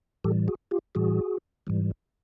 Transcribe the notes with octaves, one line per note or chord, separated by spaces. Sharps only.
A2 E3 G3 G4 A4
F#4 G#4
F4 G4
A2 E3 G3 F#4 G#4
G#2 E3 G3